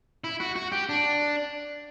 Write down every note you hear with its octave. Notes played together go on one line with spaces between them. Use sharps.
E4
F#4
F#4
G4
D4